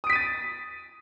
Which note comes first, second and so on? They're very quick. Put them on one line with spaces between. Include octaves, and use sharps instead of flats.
D#6 D7 B6 D#7 A6